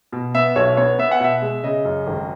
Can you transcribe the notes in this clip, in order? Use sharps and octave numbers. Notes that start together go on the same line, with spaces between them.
B2
B3 E5
B1 C#5
B3 C#5
B3 E5
F#5
B2 E5
G#3
C#3 D#5
F#2
G#1